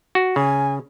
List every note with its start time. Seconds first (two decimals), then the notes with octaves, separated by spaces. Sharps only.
0.15 F#4
0.36 C#3 G#5